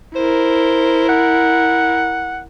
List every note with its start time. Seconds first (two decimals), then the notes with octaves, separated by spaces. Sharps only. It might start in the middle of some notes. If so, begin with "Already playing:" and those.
0.16 E4 A#4 C5
1.09 F#5